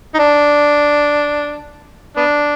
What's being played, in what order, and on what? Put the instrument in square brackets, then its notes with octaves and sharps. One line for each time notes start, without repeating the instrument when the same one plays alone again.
[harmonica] D#4
D4
B3 D4